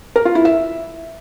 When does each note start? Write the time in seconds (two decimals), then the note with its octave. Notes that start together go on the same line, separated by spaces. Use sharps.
0.16 A#4
0.25 F4
0.35 E4
0.45 E5